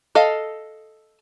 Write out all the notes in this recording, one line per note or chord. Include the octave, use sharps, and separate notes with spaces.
A4 D#5 F5